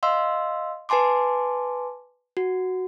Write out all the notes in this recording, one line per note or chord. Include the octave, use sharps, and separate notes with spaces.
D#5 F5 C6 E6
B4 G#5 A5 C6 D6
F#4